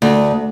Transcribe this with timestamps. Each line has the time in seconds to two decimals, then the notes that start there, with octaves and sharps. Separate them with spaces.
0.02 D2